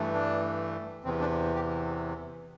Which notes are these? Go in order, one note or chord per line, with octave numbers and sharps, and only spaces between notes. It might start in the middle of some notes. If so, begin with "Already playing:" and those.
Already playing: G2 E3 A3
D4
E2 C3 E3 C4
D4
G4